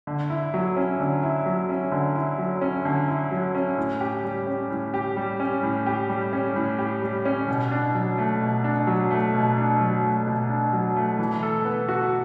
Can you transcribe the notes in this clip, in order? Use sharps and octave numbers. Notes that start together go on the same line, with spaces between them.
D3
E4
F#3
C#4
D3
E4
F#3
C#4
D3
E4
F#3
C#4
D3
E4
F#3
C#4
A2
G4
G3
C#4
A2
G4
G3
C#4
A2
G4
G3
C#4
A2
G4
G3
C#4
B2
D4
F#3
A3
B2
D4
F#3
A3
B2
D4
F#3
A3
B2
D4
F#3
A3
E3
A4
B3
F#4